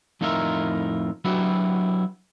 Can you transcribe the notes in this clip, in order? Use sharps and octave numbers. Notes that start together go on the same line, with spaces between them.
F2 A2 D#4 F4 A#4 E5
F#3 B3 D4 E4 F#4 G4